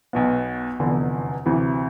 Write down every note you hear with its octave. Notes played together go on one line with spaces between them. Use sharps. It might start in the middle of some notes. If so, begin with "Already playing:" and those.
B1 B2 B3
F1 E2 D3
D2 C3 E3